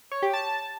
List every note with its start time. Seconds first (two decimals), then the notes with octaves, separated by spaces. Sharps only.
0.12 C#5
0.22 G4
0.33 A5